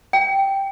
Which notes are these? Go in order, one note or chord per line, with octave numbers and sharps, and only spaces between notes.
G5